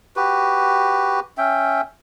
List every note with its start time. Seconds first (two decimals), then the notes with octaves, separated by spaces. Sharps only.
0.16 F#4 G4 B4
1.38 C#4 E5 G5